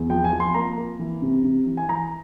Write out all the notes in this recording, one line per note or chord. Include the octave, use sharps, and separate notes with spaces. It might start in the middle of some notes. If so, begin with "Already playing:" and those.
Already playing: E2
F3 G5
G#5
F3
C6
A#3 A#5
A#3
E3
C3
C3
E3
G#5
E3 A#5